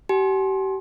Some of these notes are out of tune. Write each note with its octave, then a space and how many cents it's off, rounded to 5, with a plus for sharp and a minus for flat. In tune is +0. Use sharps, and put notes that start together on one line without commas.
G4 -35 G#5 +40